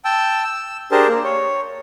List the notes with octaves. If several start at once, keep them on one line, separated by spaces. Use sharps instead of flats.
G5 A5 E6
E6
D4 G4 G#4 A#4 C5 A5
A#3
C#5